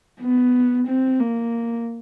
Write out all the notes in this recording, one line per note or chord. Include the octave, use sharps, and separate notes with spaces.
B3
C4
A#3